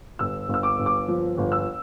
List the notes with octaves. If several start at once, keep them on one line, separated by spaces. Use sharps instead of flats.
G1 E6
G1
E6
D6
G1
D6
F3
G1
E6